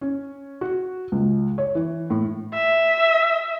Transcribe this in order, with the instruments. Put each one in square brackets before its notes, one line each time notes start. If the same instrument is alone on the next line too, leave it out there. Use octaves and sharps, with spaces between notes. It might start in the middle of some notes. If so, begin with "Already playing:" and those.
[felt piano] C#4
F#4
C#2
C#5
E3
A2
[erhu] E5